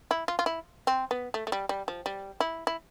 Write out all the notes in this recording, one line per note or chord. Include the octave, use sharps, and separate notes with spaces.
E4
F4
F4
E4
C4
B3
A3
A3
G3
G3
F3
G3
E4
E4